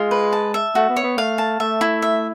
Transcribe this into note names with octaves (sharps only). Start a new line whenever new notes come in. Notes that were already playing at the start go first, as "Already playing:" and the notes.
Already playing: G#3 F4
B4
A5
E5
A3 F#4
B3
C#5
B3
A3 F5
A5
A3 E5
E4
E5